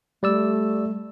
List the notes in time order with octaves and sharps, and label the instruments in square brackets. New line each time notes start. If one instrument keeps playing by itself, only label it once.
[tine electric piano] G3 D5 E6 [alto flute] A3